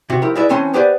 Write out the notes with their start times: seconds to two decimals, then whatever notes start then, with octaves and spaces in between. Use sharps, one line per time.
0.10 C3 F#4
0.22 F3 E4 G4 A#4
0.35 G#3 E4 B4 D5 E5
0.49 E3 C4 C#4 G#5 A5 C6
0.74 B3 G4 B4 C5 D5 G#5